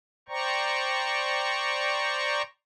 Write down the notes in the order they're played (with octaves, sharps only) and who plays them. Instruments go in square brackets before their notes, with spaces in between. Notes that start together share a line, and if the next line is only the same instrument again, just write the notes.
[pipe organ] C5 D5 G5 A#5 C#6